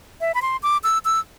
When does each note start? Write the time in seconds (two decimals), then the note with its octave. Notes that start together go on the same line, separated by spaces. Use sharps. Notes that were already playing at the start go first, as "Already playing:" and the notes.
0.21 E5
0.34 B5
0.42 C6
0.63 D6
0.84 E6
1.05 E6